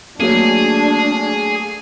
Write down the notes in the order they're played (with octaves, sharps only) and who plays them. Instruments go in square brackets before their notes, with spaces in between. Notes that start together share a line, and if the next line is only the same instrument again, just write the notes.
[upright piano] F#3 A3 A#3 [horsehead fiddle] D4 [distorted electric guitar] G#4